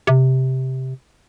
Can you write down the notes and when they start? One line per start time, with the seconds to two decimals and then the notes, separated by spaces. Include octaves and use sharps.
0.07 C3